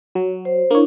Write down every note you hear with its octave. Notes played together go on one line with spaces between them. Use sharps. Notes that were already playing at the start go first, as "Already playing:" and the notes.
F#3
C5
A#3 D4 E4 C#5